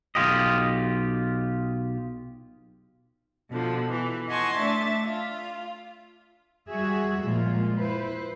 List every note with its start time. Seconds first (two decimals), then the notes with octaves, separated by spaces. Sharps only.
0.15 B1 A#2 F4 G4 D#5
3.50 B2 D3 F3
3.88 E3
4.28 D#5 F#5 G#5 A5 C6 C#6
4.58 A3 D4 E5 A6
5.05 F4
6.68 G3 F#4 G#4 E5
7.24 A#2 F3 G#3 F4
7.77 E4 B4 C5